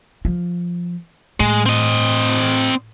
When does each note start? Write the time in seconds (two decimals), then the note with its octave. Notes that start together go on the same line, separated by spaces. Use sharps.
0.25 F3
1.40 A2 G#3
1.66 C4 D#5